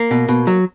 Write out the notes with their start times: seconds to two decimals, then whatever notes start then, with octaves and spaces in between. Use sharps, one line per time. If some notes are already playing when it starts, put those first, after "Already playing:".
Already playing: A#3
0.11 B2
0.29 B2
0.47 F#3